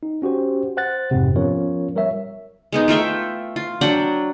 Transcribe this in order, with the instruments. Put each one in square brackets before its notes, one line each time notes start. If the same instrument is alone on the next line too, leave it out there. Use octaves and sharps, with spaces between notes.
[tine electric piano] D#4
C#4 F#4 G4 C5
C5 F#5 F#6 A6
F2 G#2 C3
F3 B3 C#4 F4 A#4 C#5
G3 A#4 C#5 E5
[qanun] G#3 B3 D#4
A3 F4 E5 G5
F4
F#3 D4 F#5 G5